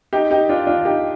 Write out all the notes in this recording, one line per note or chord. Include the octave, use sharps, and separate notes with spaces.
D#4 G4
D#4 G4
D4 F4
D4 F4
D#4 G4